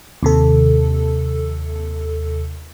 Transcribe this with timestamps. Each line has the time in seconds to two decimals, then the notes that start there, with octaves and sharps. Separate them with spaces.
0.23 D#2 C3 A4